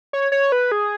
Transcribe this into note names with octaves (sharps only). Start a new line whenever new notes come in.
C#5
C#5
B4
G#4